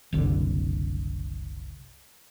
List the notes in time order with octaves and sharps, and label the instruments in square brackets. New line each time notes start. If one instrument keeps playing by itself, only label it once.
[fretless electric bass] F#1 C2 D3